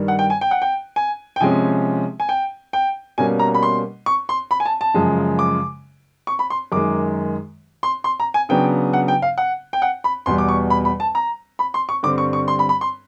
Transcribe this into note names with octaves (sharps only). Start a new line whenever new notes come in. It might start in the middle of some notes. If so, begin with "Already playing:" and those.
Already playing: G2 D#3 G3
F#5
G5
G#5
G5
F#5
G5
G#5
G5
C3 F3 G#3 C#4 G#5
G#5
G5
G5
B2 G3 A#3 C#4 G#5
A#5
B5
C6
C#6
C6
B5
G#5
A5
A5
F#2 C#3 F3 G#3
D6
C#6
B5
C6
F#2 D#3 G#3 D6
C6
C6
A#5
G#5
C#3 F#3 B3 D4 G5
F#5
G5
F5
F#5
G5
F#5
B5
E2 B2 G3 C6
D6
C#6
B5
B5
A5
A#5
B5
C6
C#6
G2 D3 G3 C4 D6
C#6
C#6
C6
B5
B5
C6